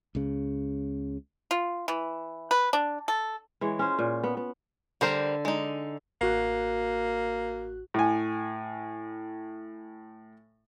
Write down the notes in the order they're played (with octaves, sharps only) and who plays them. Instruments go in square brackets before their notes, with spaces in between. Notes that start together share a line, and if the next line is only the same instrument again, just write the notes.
[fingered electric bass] C#2 C#3
[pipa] F4
E3
B4
D4
A4
[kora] E3 G#3 C#5
C#4 F4 C5
A#2
B3
B3
[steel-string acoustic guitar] D3 [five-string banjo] G3 A#4 C5
[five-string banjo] G#3 D#4
[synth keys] A1 F#4 F#6 [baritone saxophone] A#3
[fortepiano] A2 G#5